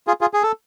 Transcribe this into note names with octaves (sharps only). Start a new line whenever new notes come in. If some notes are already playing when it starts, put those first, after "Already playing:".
F4 G#4
F4 G#4
G#4
A4